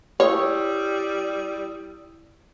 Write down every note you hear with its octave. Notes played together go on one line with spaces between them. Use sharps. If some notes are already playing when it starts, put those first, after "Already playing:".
G3 E4 C#5 D#6 E6